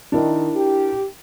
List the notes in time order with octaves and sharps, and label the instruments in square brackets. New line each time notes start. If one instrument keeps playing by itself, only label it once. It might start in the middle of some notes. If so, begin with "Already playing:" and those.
[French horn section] D#3 [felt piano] D4 E4 A#4
[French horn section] G4